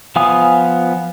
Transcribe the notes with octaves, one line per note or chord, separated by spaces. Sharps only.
F3 B3 F5 G#5 D#6